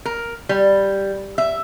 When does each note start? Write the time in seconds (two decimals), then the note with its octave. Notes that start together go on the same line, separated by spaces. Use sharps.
0.05 A#4
0.49 G3
1.38 E5